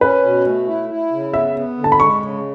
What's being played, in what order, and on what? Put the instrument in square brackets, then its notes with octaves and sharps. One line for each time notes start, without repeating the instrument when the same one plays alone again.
[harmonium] C#4 [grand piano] B4
[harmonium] B2
A3
E4
E4
C#3
[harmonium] B3 [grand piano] E5
[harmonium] B3
D3
[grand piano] A5
B5
[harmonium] G#3 [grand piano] C#6
[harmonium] C#3